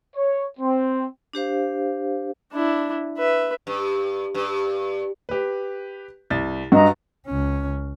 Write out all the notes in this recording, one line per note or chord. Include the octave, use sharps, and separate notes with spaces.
C#5
C4
D4 G4 C5 F5
D4 E4
B4 E5
G2
G2
G4 B4
C2 A6
G2 F#4 D#5 A#5
C#2 C#4